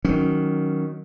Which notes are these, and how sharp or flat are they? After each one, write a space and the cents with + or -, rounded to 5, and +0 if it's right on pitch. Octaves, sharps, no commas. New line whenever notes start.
D#3 +0 F#3 +0 C#4 +0